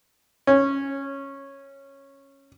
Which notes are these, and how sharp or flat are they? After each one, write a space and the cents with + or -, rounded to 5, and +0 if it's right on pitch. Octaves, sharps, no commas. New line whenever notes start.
C#4 -10